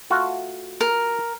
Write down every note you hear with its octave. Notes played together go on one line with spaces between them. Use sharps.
A3 F4 F#4
A#4